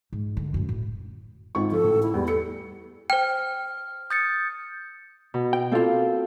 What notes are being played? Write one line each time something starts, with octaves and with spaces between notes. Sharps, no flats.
G#2
D3 G#3
F#2 A2
A2
G#1 F4 C#6
F3 F4 A4
A1
E4
E2 G3
A4 C#7
C5 G5 F6
D#6 G6 A6 C#7
B2
G5
A#3 C4 F4 A4